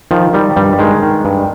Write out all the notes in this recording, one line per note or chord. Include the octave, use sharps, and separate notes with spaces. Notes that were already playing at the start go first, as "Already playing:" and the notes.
D#3 F3
D#3 G3
G2 G3
D#3 G#3
D#3
G2